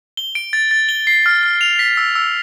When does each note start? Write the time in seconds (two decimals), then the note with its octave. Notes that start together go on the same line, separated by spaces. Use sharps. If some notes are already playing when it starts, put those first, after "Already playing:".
0.17 G7
0.35 D7
0.53 A6
0.71 A6
0.89 G7
1.07 C7
1.26 F6
1.43 F6
1.61 F7
1.79 B6
1.97 E6
2.15 E6